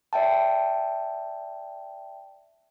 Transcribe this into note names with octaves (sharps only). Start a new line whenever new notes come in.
D5 E5 G5 A5